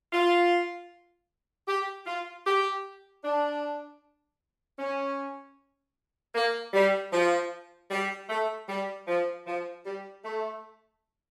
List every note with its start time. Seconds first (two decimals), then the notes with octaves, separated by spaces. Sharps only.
0.13 F4
1.68 G4
2.07 F4
2.46 G4
3.24 D4
4.79 C#4
6.35 A#3
6.73 G3
7.12 F3
7.91 G3
8.29 A3
8.68 G3
9.07 F3
9.46 F3
9.85 G3
10.24 A3